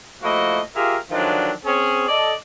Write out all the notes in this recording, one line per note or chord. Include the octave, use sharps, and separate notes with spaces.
F3 A3 A#3 E4 F#4 D#5
F4 G4 G#4 A#4 E5 F5
D3 D#3 F3 F#3 G#3 D4
C4 C#4 G#4
A4 D5 D#5